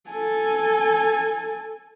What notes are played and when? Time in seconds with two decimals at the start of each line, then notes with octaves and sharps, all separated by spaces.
0.10 A4 G#5